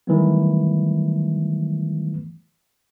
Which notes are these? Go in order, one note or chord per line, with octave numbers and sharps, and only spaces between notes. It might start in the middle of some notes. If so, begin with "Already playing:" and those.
D#3 E3 F#3 G3 A3 B3